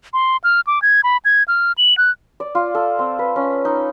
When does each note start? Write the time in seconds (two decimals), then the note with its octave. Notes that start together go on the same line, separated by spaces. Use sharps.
0.13 C6
0.44 F6
0.67 D6
0.82 G#6
1.04 B5
1.25 G#6
1.48 F6
1.78 F#7
1.97 F#6
2.40 D5
2.55 F4
2.75 A4
2.99 C4
3.19 B4
3.36 C#4
3.65 D#4